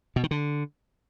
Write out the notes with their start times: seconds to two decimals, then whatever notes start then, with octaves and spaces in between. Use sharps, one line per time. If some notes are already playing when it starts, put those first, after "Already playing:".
0.16 B2
0.23 D#3
0.31 D3